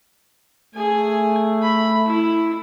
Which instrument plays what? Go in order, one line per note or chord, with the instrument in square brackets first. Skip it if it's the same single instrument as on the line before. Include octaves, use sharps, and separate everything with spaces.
[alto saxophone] A3 [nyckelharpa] G#4 G#5
[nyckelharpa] B5
E4